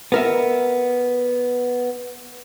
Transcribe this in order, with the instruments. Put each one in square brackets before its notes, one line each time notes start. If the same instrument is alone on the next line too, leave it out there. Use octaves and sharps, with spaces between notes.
[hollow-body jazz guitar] B3 A#4 E5